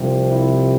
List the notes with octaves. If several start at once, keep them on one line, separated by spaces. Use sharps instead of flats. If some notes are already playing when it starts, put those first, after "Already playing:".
Already playing: C2 C3 F3
E4